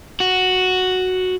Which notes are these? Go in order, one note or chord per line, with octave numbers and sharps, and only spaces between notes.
F#4